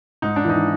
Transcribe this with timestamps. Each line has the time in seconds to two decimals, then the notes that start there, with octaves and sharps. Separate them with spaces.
0.22 G#2 D#4
0.36 D4
0.45 E3 D#4